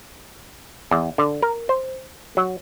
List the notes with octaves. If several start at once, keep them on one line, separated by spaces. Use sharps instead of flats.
E2
D3
A#4
C5
F#3